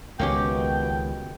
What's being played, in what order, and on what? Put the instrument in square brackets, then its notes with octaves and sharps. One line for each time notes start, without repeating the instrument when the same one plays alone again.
[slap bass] C#2 D#3 [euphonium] B2 [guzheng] A#3 C#4 G4 [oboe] G5